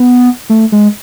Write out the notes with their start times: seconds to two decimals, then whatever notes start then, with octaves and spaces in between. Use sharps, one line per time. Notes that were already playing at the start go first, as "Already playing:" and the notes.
Already playing: B3
0.50 A3
0.72 G#3